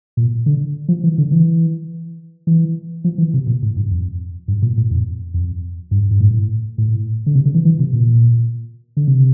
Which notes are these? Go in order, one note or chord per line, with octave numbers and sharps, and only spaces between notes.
A#2
D3
F3
E3
D3
E3
E3
F3
E3
C3
A#2
A2
G2
F2
G2
A#2
A2
F2
F2
G2
G2
A2
A2
D3
C3
D3
E3
E3
C3
A#2
D3
C3